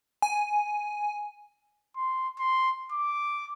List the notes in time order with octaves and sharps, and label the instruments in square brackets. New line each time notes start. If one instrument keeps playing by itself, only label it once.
[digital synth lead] G#5
[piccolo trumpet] C6
C6
D6